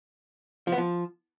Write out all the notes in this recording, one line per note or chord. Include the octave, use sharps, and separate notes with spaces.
F3
B3
F3